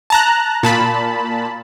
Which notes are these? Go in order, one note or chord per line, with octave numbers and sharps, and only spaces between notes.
A5 A#5 F#6
A#2 A5 B5